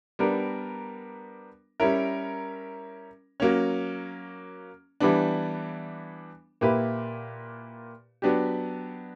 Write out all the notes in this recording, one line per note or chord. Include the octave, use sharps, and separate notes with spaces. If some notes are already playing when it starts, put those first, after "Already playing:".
G3 B3 D4 A#4
G3 C#4 E4 A#4
F#3 A#3 C#4
E3 G3 B3 D4
A#2 A#3 E4 G4 B4
F#3 B3 D4 G4